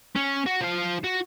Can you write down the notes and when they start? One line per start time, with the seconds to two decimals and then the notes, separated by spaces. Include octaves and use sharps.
0.16 C#4
0.46 F#4
0.61 F3 F5
1.04 F#4